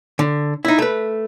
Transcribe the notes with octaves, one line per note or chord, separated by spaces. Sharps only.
D3
D#4 E4
A3 B4